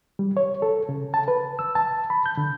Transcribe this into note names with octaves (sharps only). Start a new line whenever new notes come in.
G3
C#5
A4
C#3
A5
B4
E6
A5
B5
G6
D3